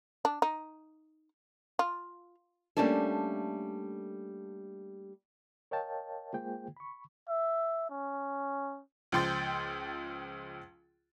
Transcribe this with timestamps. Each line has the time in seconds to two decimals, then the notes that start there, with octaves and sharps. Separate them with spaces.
0.25 D4
0.42 D#4
1.79 F4
2.77 G3 A3 A#3 C#4 D4 A4
5.71 A#4 C#5 D#5 F5 G5 A5
6.33 G#3 A#3 F4 G#4 C5 G5
6.77 B5 C#6
7.29 E5
7.90 C#4
9.12 C#2 F3 G5 C6 A6